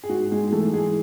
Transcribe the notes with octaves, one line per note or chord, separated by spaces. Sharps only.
G#4
G#2 F#4
G#3 G#4
G#4
E3 A3 A4
G#3 G#4